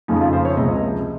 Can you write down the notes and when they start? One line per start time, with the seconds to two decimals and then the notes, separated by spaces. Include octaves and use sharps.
0.08 F2 C#3 F3 D#4
0.20 F4
0.33 C5
0.45 C#5
0.57 C#2 C3 F3 D#5